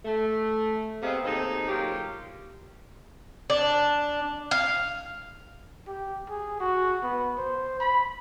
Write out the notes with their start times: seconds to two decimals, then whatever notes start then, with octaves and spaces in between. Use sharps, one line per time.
0.05 A3
1.02 C3 B3 C4 G#4 D#5 F5
1.25 D#2 C3 D#4 G#4 A4 C5
1.68 F#3 A#3 F4 G4
3.50 D4
4.51 F5
5.87 G4
6.30 G#4
6.60 F#4
7.03 B3
7.38 C5
7.80 B5